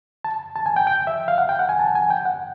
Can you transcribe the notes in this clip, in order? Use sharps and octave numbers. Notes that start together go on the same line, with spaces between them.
A5
A5
G#5
G5
G5
E5
F5
F#5
G5
F#5
G#5
A5
G#5
G5
F#5